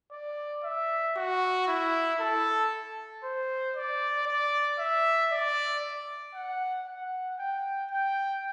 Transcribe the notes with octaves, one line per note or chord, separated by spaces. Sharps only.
D5
E5
F#4
E4
A4
C5
D5
D5
E5
D5
F#5
F#5
G5
G5